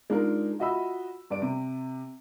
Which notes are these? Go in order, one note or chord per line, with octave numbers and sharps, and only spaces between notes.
G#3 D4 D#4 F4 A#4
F4 F#4 D#5 E5 B5 E6
G2 D5 D7
C3